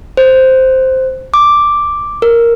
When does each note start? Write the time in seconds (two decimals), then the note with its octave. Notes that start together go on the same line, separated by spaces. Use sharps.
0.17 C5
1.34 D6
2.22 A#4